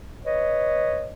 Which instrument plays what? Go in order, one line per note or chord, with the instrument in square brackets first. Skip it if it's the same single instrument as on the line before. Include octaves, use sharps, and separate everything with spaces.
[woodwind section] B4 C#5 D#5